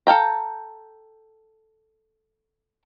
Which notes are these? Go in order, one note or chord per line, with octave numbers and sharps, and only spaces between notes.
A4 F5 G5 A#5